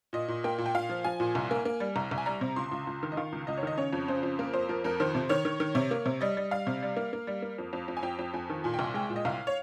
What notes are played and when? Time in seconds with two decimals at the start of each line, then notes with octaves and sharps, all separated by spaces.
0.13 A#2 D#5
0.28 A#2
0.44 A#3 G5
0.58 A#2
0.66 G5
0.74 A#2 F5
0.89 F3
1.04 F3 G#5
1.20 A#2
1.35 C2
1.51 A#3
1.65 A#3
1.80 G3
1.96 C2 A#5
2.11 C2
2.18 G#5
2.26 G3 A#5
2.41 C3
2.56 C#2 C6
2.71 C#2
2.87 C#2
3.03 D#3
3.12 D#5
3.17 D#3 F5
3.32 C#2
3.47 C#2 D#5
3.57 C#5
3.63 D#3 D#5
3.78 C#3 C#5
3.93 F2
4.08 C#3 C5
4.23 F2
4.39 A#3 A#4
4.53 F2 C5
4.69 F3 A#4
4.84 F2 A#4
5.00 D#3 C5
5.15 C3
5.29 D#3 C#5
5.45 D#3
5.60 D#3
5.75 C3
5.91 A#3
6.06 C3
6.21 G3 D#5
6.37 G3
6.51 G3 F5
6.67 C3
6.82 G3
6.96 A#3
7.13 A#3
7.27 G3
7.42 A#3
7.58 F2
7.73 F2
7.88 F2
7.97 G#5
8.03 F2 G5
8.19 F2
8.34 F2 G#5
8.50 D#3
8.64 A#2 G#5
8.74 G5
8.79 C2
8.84 G#5
8.94 G#3 G5
9.10 A#2
9.16 D#5
9.25 C2 F5
9.47 C#5